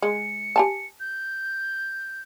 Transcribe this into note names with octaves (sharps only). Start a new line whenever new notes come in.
G#3 C#7
G4 G#5 A5
G6